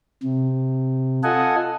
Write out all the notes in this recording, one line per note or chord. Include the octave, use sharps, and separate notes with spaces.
C3
F4 A4 D#5 F#5 G#5